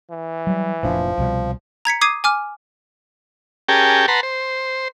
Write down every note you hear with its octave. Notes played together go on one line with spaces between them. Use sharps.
E3
F#3 G3
F1 A#2 F3 D4
C2 B2 G3
A#5 G#6 B6 C#7
D6 D#6 G#6 C7 D#7
G#5 D6 F6
C#4 G4 G#4 A#4 G5 A5
B4 F#5 A5 A#5 C6
C5